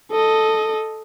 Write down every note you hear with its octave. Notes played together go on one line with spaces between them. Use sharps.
A4 D#5